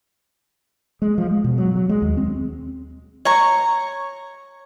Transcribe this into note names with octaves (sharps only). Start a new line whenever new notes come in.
G#3
F3
G#3
B2
F#3
F#3
G#3
D#2
C4
C#5 A#5 C#6